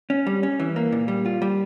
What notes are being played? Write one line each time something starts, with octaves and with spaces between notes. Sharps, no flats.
C#4
G3
C#4
E3
A#3
A#2
G3
F4
G3